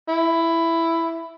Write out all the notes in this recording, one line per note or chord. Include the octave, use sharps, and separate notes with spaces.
E4